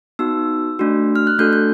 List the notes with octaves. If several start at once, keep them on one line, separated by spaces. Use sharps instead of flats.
B3 D#4 F#4 E6
A3 D4 F#4
F6
F#6
A3 D4 F#4 A4 G6
G6